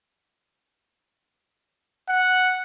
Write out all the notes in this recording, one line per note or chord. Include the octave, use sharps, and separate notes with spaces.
F#5